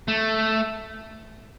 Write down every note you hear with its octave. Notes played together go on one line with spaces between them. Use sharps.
A3